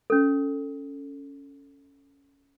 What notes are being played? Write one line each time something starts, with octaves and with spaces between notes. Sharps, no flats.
C#4 A4